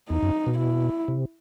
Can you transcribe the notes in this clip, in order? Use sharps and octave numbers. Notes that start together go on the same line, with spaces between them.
E2 D#4
F#2
B2
E4
C3